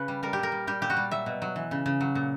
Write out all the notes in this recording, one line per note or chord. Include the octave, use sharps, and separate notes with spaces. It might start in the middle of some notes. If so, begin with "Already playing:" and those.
Already playing: C#3 B4 C#5
G3
G3 A#4
A#2 G4
A#4
G3
G3 G4
A#2 G4
F#4
G3
F#3 E5
B2
F#3
E3
C#3
C#3
F#3
A#2